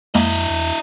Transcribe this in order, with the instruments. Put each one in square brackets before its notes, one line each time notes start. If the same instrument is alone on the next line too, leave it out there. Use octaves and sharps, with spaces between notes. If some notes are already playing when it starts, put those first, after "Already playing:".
[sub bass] F2 [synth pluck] G#3 A#3 [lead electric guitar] E4 D#5
[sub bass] E2